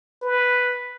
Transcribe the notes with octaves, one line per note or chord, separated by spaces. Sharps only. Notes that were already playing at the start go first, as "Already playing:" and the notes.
B4